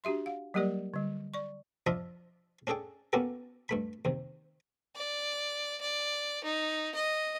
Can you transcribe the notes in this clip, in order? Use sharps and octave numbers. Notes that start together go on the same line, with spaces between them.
D4 F#4 G4 E5 C6
F5 F#5
F#3 G3 A#3 G4 A#4 D5
D3 G3
D5 C#6
F3 D4 F4 D#5 E5
C#4 D4 G#4 A4 G5
A#3 B3 C#4 F#4 G4 A4
G2 A3 B5
D#2 C3
D5
D5
D#4
D#5